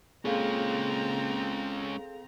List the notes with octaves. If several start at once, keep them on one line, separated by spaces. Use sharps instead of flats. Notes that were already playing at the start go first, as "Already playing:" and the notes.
A#2 G#3 C4 C#4 G#4 A4 F5 A#5